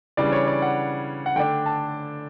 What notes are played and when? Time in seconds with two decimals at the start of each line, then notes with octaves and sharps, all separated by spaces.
0.17 C#3 E3 G3 D4 D5
0.32 C#5
0.48 D5
0.62 F#5
1.26 F#5
1.36 D3 A3 D4 G5
1.66 A5